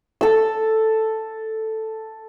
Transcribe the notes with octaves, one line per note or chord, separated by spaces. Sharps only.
A4 E6